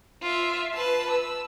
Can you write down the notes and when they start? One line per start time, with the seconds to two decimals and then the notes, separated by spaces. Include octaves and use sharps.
0.22 F4 E5
0.75 B4 A5
1.11 E6